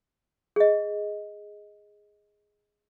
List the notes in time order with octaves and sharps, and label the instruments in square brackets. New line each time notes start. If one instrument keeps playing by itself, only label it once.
[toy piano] G#4 D#5